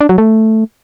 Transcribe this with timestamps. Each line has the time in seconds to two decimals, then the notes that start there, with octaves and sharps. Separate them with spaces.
0.01 D4
0.09 F#3
0.18 A3